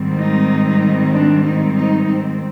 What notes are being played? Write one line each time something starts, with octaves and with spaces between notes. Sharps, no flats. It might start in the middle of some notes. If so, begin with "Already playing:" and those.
Already playing: G#2 D#3 G3 C4
D#4
D4
D#4
D#4
C4